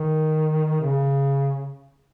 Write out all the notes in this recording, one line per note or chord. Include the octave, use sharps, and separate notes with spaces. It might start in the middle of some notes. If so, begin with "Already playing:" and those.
Already playing: D#3
C#3